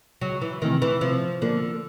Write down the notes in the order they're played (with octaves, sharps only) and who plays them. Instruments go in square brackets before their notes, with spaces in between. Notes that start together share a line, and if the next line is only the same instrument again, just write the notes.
[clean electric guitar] C#2 [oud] F#3
[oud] E3
[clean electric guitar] C3 E3 A3 [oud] D#3
[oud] E3
[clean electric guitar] C3 [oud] F3
[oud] D3 [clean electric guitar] F3 A#3